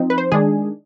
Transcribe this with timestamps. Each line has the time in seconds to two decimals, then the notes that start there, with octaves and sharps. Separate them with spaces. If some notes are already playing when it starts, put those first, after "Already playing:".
Already playing: F3 C4 D#4
0.10 B4
0.18 C5
0.32 D#3 G#3 D4 G#4